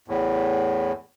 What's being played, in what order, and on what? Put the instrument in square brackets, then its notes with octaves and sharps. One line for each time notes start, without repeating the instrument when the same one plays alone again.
[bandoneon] E2 A2